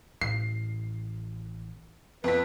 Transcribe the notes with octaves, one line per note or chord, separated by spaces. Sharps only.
A1 C7
F2 B4 B6